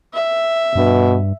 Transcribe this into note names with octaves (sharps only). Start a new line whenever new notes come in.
E5
G2 B2